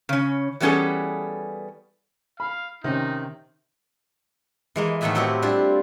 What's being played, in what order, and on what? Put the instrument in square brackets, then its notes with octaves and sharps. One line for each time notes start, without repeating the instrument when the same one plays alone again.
[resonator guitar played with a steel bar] C#3 C#4
E3 G3 B3 C#4 G#4 A4
[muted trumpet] F5 [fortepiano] B5
[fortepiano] C3 C#4 [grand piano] D#3 [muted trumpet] D#4
[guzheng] E3 G#3 A#3
A2 D#3 A3 B3 E5 G#5
F#3 C4 E4 F#4 G4 B4
G3 D4 E4 F4 G4